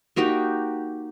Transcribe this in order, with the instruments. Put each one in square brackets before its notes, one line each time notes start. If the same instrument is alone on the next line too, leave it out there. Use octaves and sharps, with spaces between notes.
[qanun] A#3 D#4 F#4 G4